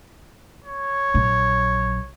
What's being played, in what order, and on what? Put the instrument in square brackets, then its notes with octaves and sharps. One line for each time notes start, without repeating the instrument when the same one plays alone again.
[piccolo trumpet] C#5
[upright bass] A#1 F#3